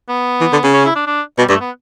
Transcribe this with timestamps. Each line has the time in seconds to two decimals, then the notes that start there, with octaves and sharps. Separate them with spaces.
0.09 B3
0.41 E3
0.53 D3
0.64 C#3
0.74 C#4
0.85 E4
0.96 D4
1.07 D4
1.38 B2 G3
1.49 G2 A3
1.61 B3